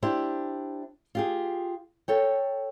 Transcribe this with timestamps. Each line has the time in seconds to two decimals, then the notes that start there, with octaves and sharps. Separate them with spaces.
0.03 D4 E4 G4 C5
1.15 F4 G4 G#4
2.08 A4 C#5 G5